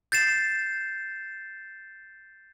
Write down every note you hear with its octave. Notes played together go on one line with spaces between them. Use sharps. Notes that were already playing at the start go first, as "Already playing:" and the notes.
G6 A6 C7 E7